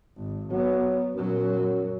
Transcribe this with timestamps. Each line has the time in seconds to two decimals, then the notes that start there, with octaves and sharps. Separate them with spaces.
0.16 G#1
0.51 F#3 B3
1.15 F#2 A#2 F#3